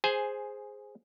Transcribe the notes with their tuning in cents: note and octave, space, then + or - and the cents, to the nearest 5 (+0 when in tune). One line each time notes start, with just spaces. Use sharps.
G#4 +0 C5 +0 G#5 +10